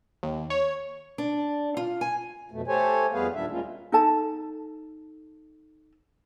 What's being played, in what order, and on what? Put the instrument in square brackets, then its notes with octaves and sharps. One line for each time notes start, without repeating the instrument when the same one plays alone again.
[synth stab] D#2
C#5
[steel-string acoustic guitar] D4
F4
G#5
[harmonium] F2 B2 A3
A3 G4 A4 C5 C#5 G#5
F2 G3 B3 G#4 B4 F5
D#2 A#2 D#3 G3 D4 E5
G3 G#3 A#3 C#4 F4
[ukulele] D#4 A4 A5